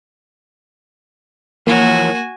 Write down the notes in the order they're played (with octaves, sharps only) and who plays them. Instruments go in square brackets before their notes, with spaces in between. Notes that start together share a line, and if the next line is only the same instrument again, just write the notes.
[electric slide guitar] E3 F3 C#5 [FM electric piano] A#3 [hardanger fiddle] F#4 G#5